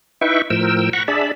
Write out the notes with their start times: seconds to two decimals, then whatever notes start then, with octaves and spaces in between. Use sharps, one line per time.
0.21 D#4 E4 B4 E5 G5 C#6
0.50 A2 F3 A#4 G5 E6
0.93 F#5 A#5 B5 C#6
1.08 D4 G#4 D5 E5 A5 B5